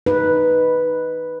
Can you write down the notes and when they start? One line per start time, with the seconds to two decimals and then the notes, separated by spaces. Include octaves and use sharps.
0.06 D#4 B4